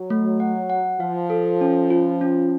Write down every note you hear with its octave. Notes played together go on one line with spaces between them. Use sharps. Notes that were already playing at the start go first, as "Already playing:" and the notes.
Already playing: F#3
A3
F#5
F#5
F3 F5
A4
C#4
F4
C#4